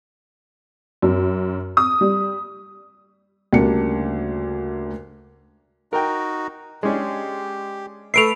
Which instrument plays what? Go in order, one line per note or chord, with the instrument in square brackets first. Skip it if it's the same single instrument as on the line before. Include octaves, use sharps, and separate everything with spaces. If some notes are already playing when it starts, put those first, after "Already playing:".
[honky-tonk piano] F#2
D#6
G3
[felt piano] D2 C#3 G3 A#3 D4 C#7
[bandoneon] D#4 F#4 [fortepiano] A#4 G5
[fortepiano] G#3 C#4 D4 [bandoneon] G4
[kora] A3 B4 E5 [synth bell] C7 D7 F7